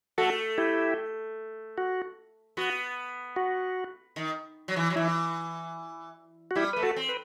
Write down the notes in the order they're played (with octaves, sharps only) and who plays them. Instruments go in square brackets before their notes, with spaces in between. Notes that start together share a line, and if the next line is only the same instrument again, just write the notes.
[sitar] A3 [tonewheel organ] F#4 A4
[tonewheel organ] E4 G4
F#4
[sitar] B3 [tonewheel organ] F#4
[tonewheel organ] F#4
[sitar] D#3
F#3
E3
F#3
[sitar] E3 [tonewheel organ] E4
[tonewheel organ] F#4
[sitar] G3 [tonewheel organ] E4 G4
[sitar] A3 [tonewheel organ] B4
[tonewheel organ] F#4 A4
[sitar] C4
[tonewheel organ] B4